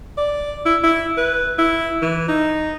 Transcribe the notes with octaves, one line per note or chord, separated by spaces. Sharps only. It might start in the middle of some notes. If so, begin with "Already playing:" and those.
D5
E4
E4
B4
E4
E3
D#4